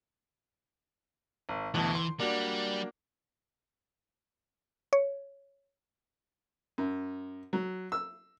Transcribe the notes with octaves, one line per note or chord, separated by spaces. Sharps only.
G#1
D2 G2 B2 E3
C6
G3 A#3 D4 F#4
C#5
F#2
F#3
E6